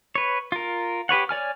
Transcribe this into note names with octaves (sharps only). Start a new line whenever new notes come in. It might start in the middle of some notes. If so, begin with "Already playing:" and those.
B4 C#5
F4 A#4
G4 B4 C#5 F#5
C#5 D5 G#5 F6